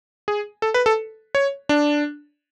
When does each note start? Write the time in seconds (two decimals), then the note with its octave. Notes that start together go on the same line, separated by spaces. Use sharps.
0.28 G#4
0.62 A4
0.74 B4
0.86 A4
1.35 C#5
1.69 D4